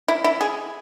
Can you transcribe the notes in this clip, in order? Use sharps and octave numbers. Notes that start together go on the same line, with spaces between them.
E4
E4
G#4